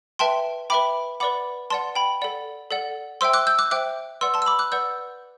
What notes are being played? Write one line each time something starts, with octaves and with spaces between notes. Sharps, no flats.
B4 E5 G5 A5 C6
B4 E5 G5 B5 D6
B4 D5 F#5 B5 D6
B4 D5 F#5 A5 C6
G5 B5
A4 D5 F#5
A4 D5 F#5
C5 E5 G5 C6 E6
D6 F#6
E6 G6
D6 F#6
C5 E5 G5 D6 F#6
B4 D5 F#5 C6 E6
A5 C6
E6
B5 D6
D6 F#6
B4 D5 F#5 E6 G6